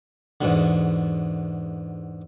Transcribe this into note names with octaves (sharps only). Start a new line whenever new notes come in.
E2 G#2 B2 D3